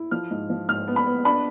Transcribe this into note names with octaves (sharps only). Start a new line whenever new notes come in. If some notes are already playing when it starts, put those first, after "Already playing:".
Already playing: E4
F3 F6
G#2
F3
G#2 F6
B3
B5
B3
D4 B5